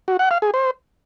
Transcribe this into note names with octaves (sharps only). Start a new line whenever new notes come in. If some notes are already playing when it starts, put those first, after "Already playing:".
F#4
F#5
F5
G#4
C5